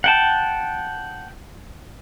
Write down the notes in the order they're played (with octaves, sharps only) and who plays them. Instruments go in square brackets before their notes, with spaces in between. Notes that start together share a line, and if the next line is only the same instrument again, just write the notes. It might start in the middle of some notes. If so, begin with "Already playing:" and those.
[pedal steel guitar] F#5 G5 A5